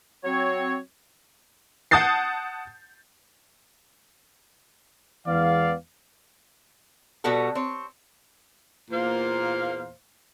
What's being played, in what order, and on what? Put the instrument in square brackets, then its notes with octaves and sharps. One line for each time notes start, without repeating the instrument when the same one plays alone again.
[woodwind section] F#3 C4 C#5
[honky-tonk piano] F#5 A5 D#6 G6 A6 C7
[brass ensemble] E2 E3 G#3 B3 D5 F5
[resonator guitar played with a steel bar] B2 G3 B3 F#4 A4
C4 C#5
[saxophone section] E2 A#2 A#3 C5 F5